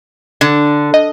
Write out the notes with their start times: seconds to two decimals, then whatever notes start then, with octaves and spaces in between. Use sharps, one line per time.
0.41 D3
0.94 D#5